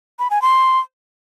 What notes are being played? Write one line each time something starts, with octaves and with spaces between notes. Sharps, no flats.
B5
G#5
C6